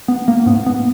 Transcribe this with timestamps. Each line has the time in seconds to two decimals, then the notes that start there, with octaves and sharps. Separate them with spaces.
0.08 B3
0.28 A#3
0.46 G#2 B3
0.66 B3